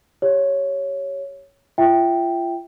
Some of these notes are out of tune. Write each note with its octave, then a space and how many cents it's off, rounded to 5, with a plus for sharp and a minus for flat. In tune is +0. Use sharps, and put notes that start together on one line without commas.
G4 +0 C#5 +0
F4 -30 E5 +0 G5 +0